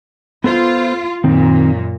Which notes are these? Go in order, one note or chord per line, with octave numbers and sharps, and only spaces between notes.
B3 F4 A4 C5
F#2 A#2 D#3 C4 D#4